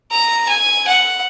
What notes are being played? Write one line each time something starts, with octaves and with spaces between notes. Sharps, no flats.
A#5
G#5
F#5